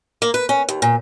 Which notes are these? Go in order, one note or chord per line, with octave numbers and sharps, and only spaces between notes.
A#3
B4
C#4
D#2
A#2